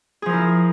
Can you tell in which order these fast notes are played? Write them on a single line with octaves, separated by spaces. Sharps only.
G#4 F3 A#4 E4